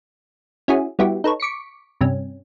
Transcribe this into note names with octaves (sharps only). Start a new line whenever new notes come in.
C#4 E4 F#4 G#4
G3 B3 E4 F#4 G4
D#4 A4 B4 C#5
C#6 D6 B6 C#7
G2 C3 C#4